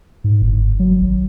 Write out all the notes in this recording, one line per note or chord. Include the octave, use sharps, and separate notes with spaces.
G#2
G1
F#3
G#1